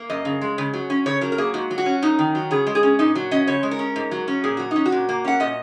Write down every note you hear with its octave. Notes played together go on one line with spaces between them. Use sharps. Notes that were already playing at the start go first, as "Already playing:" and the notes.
Already playing: A#3
F#2 D#5
C#3
G#3
C#3
F#3
C#4
C#3 C#5
F#3 A#4
A#4
A#3 G#4
G#2 F#4
F#3
F#4
C#4
F#2 D#4
D#3
F#3
C#3 G#4
G#3
G#4
C#4
A#2 D#4
F#3
C#4 D#5
C#3 C#5
G#3
A#4
C#4
G#2
F#3
C#4
A#2 G#4
F#3 F#4
C#4 D#4
F#4
A#2
A#3
C#4 F#5
A#2 D#5